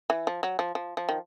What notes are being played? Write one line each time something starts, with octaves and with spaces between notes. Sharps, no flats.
E3
F3
F#3
F3
F3
F3
D#3